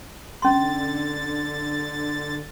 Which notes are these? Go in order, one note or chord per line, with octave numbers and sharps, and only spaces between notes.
D3 C#4 C6 A6